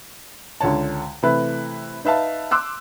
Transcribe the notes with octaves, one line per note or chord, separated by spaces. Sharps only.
C#2 D3 C#5 A5
C3 E3 A3 E4 B4
D#4 B4 E5 F5 A5
C6 D6 E6 F#6